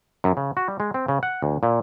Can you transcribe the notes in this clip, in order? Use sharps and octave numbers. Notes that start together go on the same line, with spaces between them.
F#2
C#3
F#4
G3
G#3
C4
C#3
F#5
D2
A#2